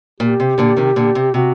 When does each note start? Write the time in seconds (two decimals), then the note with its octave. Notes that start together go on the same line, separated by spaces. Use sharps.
0.20 A#2 G4
0.40 C3
0.58 A#2 D3
0.77 C3 D#3
0.96 A#2 D3
1.15 C3
1.34 C3 F#4